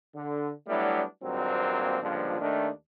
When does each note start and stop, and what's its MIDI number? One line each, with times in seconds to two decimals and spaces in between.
0.16 0.50 50
0.68 1.02 54
0.68 1.02 55
0.68 1.02 57
0.68 1.02 59
0.68 1.02 62
0.68 1.02 64
1.22 2.00 32
1.22 2.00 43
1.22 2.00 46
1.22 2.00 54
1.22 2.00 58
1.22 2.00 60
2.02 2.40 37
2.02 2.40 43
2.02 2.40 46
2.02 2.40 50
2.02 2.40 53
2.41 2.69 39
2.41 2.69 51
2.41 2.69 57
2.41 2.69 62